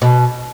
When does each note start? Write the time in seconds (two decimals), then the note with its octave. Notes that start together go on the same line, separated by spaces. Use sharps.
0.02 B2